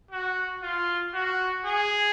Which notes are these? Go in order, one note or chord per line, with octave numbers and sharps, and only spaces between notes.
F#4
F4
F#4
G#4